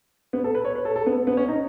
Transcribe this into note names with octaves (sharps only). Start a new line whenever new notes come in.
B3
A4
B4
C#5
B4
A4
A4
B3
B3
C#4
D#4